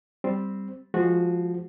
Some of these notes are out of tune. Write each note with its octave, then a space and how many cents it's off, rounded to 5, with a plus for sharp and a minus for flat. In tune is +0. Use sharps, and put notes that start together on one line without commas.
G3 +0 C4 +0
F3 +0 G#3 +0 F#4 -15